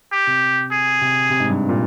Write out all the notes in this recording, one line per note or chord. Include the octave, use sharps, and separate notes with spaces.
G4
C3
G#4
C3
C3
G#2
G2
A#2